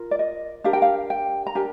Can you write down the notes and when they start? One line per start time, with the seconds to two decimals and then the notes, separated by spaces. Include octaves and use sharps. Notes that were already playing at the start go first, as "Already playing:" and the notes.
Already playing: F4 A#4
0.11 D5
0.19 D#5
0.64 D4 G4 A#4 F5
0.73 G5
0.82 F5
1.10 G5
1.47 A#5
1.55 D4 G4 A#4 G#5